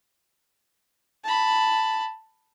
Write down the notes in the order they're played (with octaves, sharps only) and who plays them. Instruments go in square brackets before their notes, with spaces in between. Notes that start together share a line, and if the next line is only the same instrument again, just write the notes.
[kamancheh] A5 B5